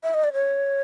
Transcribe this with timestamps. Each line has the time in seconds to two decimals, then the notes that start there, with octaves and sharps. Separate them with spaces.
0.03 E5
0.14 D#5
0.24 D5
0.33 C#5